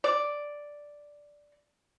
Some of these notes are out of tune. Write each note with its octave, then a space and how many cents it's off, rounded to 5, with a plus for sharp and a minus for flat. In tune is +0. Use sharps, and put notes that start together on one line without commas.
D5 +0